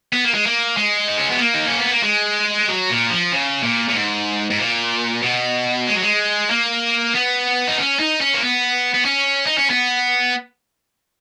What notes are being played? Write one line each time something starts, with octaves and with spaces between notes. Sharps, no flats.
B3
A#3
G#3
A#3
G#3
D#4
C#4
B3
A#3
D#4
C#4
B3
A#3
G#3
F#3
A#2
F3
C#3
A#2
A#2
G#2
G#2
A#2
B2
G#3
F#3
G#3
A#3
B3
D#4
C#4
D#4
C#4
A#3
B3
B3
C#4
D#4
C#4
B3